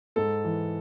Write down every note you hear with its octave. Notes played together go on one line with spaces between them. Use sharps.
G#2 A4
E3